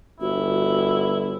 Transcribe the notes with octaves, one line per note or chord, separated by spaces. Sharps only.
G1 E4 F#4